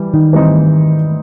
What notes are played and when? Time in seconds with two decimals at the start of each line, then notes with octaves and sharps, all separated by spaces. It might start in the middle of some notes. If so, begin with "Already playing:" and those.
Already playing: E3 G3
0.14 D#3
0.33 E3 G3 C4 D#4